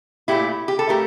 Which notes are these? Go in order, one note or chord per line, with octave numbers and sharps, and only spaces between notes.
A#2 A3 E4 G4
G4
A4
A#2 A3 G4 A#4